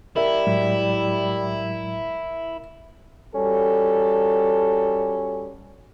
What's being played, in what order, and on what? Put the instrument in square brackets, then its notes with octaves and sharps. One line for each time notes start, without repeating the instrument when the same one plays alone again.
[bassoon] G3 [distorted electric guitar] E4 [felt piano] A#4 E5
[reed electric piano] A2 F#3 G#3
[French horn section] G3 F#4 A4 [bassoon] C#4